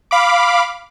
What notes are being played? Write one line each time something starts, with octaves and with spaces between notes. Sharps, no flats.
F5 B5 D6